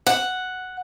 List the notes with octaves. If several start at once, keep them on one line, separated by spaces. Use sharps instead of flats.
F#5